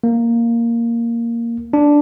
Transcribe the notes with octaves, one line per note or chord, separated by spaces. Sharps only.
A#3
D4